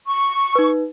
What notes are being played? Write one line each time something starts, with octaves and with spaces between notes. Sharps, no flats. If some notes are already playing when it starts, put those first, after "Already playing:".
C#6
D#4 B4